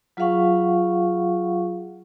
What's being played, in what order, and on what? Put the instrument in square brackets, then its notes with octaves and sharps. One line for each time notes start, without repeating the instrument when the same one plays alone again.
[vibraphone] F#3 F4 G#4 F5 F#5 C#6